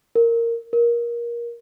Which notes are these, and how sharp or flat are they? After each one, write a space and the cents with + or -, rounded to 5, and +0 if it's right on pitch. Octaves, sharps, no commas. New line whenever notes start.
A#4 -10
A#4 +20